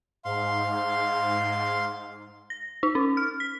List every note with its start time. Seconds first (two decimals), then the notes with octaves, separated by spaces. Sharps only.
0.25 G#2 F5 C6
2.50 A#6
2.83 D#4
2.95 C#4
3.17 F6
3.40 B6